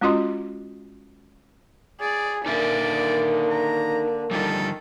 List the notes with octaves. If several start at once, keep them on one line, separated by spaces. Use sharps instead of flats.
G#3 C#4 F4 F#4 D#5 C6
G#4 D5
D3 A#3 D#4 A#4 D5 E5
A#5
D3 D#3 F3 G3 A4